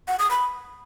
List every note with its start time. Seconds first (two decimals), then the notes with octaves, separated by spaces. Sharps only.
0.08 F#5
0.19 D#6
0.31 B5